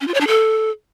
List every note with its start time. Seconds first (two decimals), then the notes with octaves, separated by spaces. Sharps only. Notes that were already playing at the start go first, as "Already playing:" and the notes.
0.01 C#4
0.08 F4
0.14 C#5
0.21 D4
0.27 A4